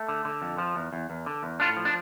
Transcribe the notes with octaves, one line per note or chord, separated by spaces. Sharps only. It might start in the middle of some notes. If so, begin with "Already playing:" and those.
Already playing: A3
D3
D3
F2
F3
E2
E2
E2
D3
E2
A2 D4 F4
F3
D4